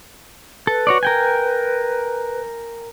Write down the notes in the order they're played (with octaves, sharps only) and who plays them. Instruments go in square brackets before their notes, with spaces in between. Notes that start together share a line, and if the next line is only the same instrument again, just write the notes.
[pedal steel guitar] A4 [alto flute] B4
[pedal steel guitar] F#4 C#5 D5
A#4 G5 G#5